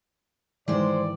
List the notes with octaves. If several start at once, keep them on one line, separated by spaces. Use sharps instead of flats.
G#2 D#3 E3 G#3 C5 D5